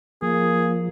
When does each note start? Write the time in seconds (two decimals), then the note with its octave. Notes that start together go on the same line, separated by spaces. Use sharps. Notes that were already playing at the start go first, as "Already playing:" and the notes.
0.22 F3 A#3 G#4